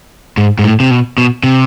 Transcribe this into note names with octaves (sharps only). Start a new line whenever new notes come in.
G#2
G#2
A2
C3
B2
B2
C3